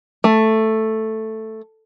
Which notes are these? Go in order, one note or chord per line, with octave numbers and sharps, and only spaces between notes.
A3